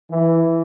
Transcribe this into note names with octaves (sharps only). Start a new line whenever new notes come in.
E3